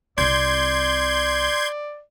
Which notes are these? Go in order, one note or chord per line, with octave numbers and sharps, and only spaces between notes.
C2 C3 D5 C6 G6 G#6